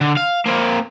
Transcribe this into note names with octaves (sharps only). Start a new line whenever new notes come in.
D3
F5
A#3 C4